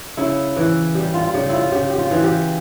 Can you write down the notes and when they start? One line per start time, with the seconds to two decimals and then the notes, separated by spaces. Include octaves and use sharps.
0.17 C#3 E4
0.57 E3
0.95 G3 G4
1.14 F4
1.24 F4
1.34 C#3 G4
1.49 E4 F4
1.72 C#3 G4
1.91 G4
1.98 F4
2.11 E3
2.24 G4